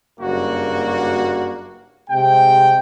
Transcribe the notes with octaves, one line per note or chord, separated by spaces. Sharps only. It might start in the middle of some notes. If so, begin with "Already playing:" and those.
F#1 G2 A#3 F#4
C3 G#3 G5